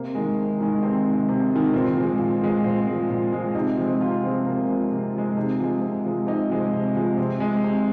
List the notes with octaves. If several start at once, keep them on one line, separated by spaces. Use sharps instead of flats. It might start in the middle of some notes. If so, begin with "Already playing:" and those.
Already playing: C3 A#3
D#3 G#3
C3
D#3 G#3
C3 C4
D#3 G#3
C3
D#3 G#3
A#2 C4
F3 G#3
A#2
F3 G#3
A#2 C4
F3 G#3
A#2
F3 G#3
C3 D#4
F3 G#3 C4
D#4
C3 F4
F3 G#3 C4
C3 A#3
F3 G#3
C3
F3 G#3
C3 D#4
F3 G#3
C3
F3 G#3
C3 D#4
F3 G#3
C3
F3 G#3
C3 C4
G#3
C3